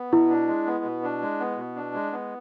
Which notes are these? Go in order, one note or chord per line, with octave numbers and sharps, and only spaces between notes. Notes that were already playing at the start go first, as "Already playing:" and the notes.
Already playing: B3
B2 E4
D4
G#3
B3
B2
D4
G#3
B3
B2
D4
G#3
B3